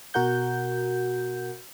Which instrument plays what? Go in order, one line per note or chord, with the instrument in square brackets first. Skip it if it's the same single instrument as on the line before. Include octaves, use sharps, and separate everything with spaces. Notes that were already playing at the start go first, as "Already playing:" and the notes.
[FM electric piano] B2 F#4 A#4 F#5 G6